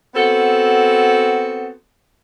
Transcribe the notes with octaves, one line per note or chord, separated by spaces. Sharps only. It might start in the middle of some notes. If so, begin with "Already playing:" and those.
B3 C4 F#4 A4